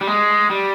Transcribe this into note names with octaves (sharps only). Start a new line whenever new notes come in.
G3
G#3
G3